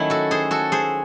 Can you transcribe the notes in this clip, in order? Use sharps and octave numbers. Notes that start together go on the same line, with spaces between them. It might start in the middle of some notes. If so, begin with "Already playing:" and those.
Already playing: D#3 F#3 A3 C#4 E4
F#4 A4
G#4 C5
F#4 A4
G#4 C5